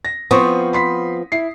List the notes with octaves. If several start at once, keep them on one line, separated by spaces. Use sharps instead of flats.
A#6
F3 B3 C4 C6 C#6 D#6
B5 C6 B6
E4 C7